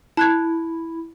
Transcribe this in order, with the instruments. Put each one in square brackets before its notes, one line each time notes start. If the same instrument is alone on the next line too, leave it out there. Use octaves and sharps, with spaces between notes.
[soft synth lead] E4 [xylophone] A5 F#6 G#6